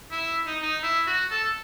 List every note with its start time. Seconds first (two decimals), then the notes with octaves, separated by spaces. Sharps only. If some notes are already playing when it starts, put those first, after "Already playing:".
0.11 E4
0.47 D#4
0.63 D#4
0.83 E4
1.07 F#4
1.31 A4